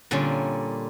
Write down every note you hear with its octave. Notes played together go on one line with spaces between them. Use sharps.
A#2 D3 G3 C#4 D4